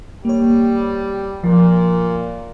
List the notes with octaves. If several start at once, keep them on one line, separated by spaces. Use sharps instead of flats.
G3 A#3 C#5
A#2 F3